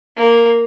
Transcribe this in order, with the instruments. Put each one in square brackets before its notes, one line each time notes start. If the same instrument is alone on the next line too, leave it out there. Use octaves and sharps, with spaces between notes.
[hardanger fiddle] A#3